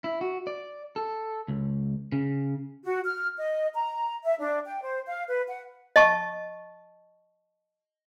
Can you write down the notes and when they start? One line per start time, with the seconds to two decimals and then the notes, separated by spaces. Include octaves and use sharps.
0.04 E4
0.21 F#4
0.47 D5
0.96 A4
1.48 C#2
2.12 C#3
2.85 F#4
3.05 F6
3.37 D#5
3.74 A#5
4.24 E5
4.39 D4
4.66 G5
4.83 C5
5.07 F5
5.28 B4
5.49 F#5
5.96 D#5 A5 C#6